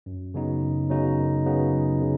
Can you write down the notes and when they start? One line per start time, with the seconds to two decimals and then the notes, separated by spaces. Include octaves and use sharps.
0.06 F#2
0.34 C#3 F#3 B3 D#4
0.63 F#2
0.90 C#3 F#3 B3 D#4
1.18 F#2
1.46 C#3 F#3 B3 D#4
1.73 F#2
2.02 C#3